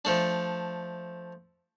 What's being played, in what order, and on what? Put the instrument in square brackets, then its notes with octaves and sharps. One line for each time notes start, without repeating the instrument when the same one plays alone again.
[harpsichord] F3 A3 D4